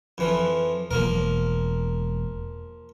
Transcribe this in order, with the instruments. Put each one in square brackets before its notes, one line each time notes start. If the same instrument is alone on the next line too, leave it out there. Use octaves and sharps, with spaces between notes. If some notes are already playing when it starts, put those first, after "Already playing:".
[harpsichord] F2 E3 F3
[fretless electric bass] E1 [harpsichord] F3 A#3 A#4